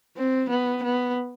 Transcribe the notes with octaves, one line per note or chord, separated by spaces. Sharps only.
C4
B3
B3